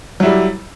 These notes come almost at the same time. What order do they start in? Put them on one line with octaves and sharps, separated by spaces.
F#3 E4 G3